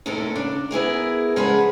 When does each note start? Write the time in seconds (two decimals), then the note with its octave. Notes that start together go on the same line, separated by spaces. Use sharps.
0.06 D#2 A2 C3 C#4 A4 A#4
0.35 C#3 D4
0.71 B3 E4 G#4 A#4
1.36 C#3 F3 G#3 F#4 G#4 B4